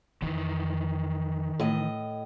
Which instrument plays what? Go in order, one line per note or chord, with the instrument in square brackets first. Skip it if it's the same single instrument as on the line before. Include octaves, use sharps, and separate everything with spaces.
[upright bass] F2 [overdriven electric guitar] D#3 E3
[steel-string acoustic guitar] A2 D#5